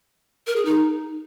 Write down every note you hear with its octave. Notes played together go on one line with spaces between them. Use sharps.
A#4
G#4
D#4